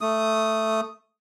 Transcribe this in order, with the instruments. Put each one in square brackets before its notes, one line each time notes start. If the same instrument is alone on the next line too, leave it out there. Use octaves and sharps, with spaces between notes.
[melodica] A3 D#6